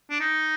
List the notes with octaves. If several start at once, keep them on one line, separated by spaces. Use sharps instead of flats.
D4
D#4